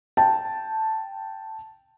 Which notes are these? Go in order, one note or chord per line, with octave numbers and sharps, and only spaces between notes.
G5 A5